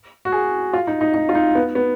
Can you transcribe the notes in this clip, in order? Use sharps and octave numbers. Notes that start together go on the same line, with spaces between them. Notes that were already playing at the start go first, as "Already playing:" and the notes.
F#4
G#4
F4
D#4
D#4
D#4
F4
D#4
B3
B3